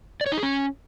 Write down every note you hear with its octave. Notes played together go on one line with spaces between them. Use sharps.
D5
C#5
D#4
G#4
C#4